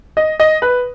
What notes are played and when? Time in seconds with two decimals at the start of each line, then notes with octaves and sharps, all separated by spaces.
0.17 D#5
0.40 D#5
0.62 B4